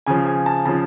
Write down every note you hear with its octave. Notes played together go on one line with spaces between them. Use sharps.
C#3 F3 G#5
G#5
A5
C#3 F3 A5